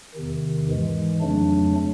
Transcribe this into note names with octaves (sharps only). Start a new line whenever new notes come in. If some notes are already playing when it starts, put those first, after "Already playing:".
E2 C3 D#3
G#2 E3 G#3
F2 C#3 F#3 A3 D4